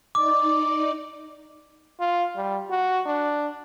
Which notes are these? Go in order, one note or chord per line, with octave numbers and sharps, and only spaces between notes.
D#4 D5 D6
F4
G3
F#4
D4